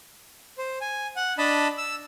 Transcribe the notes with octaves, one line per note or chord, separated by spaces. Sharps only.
C5
G#5
F#5
D4 D#5 A5 B5
E6